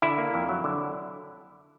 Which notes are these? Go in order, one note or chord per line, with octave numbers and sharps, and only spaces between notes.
D3 E4
A#3
F2
F#3
D3